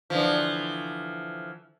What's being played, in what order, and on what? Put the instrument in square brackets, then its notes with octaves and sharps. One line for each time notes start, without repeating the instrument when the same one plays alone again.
[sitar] D3 E3 F3